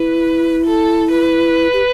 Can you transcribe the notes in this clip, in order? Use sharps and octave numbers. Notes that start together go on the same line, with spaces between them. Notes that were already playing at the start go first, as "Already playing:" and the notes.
Already playing: E4 B4
A4
B4
G4